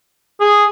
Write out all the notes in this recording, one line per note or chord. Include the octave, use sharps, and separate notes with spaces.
G#4